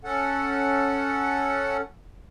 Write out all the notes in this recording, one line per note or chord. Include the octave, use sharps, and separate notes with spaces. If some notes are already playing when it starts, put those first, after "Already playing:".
C#4 A4 F#5